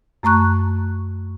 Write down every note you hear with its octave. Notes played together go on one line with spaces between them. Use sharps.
F#2 A3 A#5 C#6 F#6